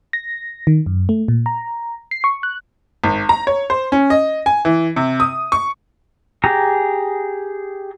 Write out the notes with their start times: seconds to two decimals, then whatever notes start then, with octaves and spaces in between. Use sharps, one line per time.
0.13 A#6
0.67 D#3
0.86 F#2
1.09 A3
1.28 A#2
1.46 A#5
2.11 C7
2.24 C#6
2.43 F#6
3.04 G#1
3.29 A#5
3.47 C#5
3.70 C5
3.92 C#4
4.10 D#5
4.46 G#5
4.65 E3
4.96 C3
5.20 D#6
5.52 C#6
6.44 G4 G#4 A#5